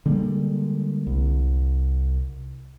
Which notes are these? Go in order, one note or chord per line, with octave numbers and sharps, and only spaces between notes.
D3 G3 G#3 A#3
C2